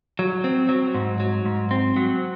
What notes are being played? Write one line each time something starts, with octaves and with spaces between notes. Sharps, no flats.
F#3
C4
F#3
G#2
F#3
G#2
C4
F#3